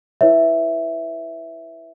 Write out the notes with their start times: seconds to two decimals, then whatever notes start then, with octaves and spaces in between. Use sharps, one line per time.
0.21 E4 B4 C#5 E5